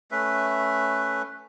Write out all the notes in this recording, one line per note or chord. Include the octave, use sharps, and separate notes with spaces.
A3 C#4 B4 E5